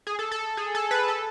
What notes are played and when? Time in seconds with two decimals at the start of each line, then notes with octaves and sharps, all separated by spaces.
0.07 G#4
0.19 A4
0.32 A4
0.57 G#4
0.75 A4
0.91 B4
1.08 A4